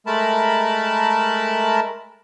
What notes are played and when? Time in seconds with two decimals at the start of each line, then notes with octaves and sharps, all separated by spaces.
0.07 G#3 A3 A#4 A5 B5